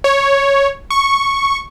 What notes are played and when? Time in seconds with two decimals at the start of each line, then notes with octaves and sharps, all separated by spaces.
0.04 C#5
0.91 C#6